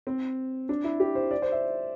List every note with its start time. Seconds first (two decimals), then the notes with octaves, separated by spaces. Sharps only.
0.07 C4
0.69 D4
0.84 E4
1.00 G4
1.15 C5
1.31 D5
1.42 C5
1.52 E5